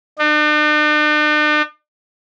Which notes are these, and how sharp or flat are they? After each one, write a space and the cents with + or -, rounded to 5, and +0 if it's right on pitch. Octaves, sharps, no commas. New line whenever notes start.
D4 +45